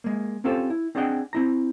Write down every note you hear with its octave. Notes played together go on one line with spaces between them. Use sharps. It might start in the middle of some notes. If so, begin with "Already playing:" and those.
G#3 A#3
C4 C#4 F4 G4 A4 C5
E4
C4 D4 G#4 D#5 F#5 G5
C4 E4 A#5